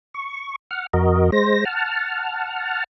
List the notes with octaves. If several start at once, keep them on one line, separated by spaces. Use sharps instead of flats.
C#6
F#5 F6
F2 F#4 A#4 D#5
G#3 C5 A#6
F#5 A5 F6